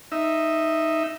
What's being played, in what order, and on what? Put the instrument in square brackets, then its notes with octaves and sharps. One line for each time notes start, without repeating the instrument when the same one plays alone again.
[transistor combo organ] D#4 E5